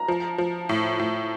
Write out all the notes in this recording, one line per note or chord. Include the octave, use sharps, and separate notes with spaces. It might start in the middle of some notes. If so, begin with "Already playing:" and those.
Already playing: A#5
F3
F3
A2
A2